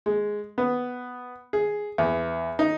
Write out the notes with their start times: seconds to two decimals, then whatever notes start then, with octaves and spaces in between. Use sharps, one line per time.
0.06 G#3
0.58 B3
1.53 G#4
1.98 E2
2.59 D#4